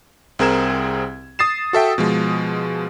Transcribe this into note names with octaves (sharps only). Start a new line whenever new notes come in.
C2 C4 G#4 A#4 G#6 E7
D#6 A6 C7 E7
F#4 A4 E5 G5
B2 F3 G#3